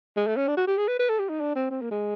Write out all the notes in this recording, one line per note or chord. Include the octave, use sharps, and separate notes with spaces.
G#3
A3
C#4
D4
F#4
G4
G#4
B4
B4
A4
G4
D#4
D4
C4
C4
A#3
G#3